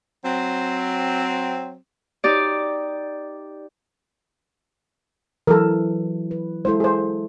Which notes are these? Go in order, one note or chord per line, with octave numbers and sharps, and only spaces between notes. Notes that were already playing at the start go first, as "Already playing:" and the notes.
F#3 C4
D#4 G4 D5
E3 F#3 A4 A#4
B4
G#3 E4 A4 C5
G#4 C5